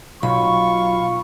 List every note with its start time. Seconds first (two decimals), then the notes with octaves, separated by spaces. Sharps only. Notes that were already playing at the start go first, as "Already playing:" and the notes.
0.23 B1 F4 B5 C#6